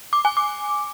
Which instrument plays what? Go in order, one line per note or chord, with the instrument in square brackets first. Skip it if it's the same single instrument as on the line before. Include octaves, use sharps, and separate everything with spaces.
[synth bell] D6
G#5
D6